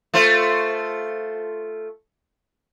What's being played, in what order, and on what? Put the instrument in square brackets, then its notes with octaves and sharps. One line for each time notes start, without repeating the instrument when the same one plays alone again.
[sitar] A3 F4 C5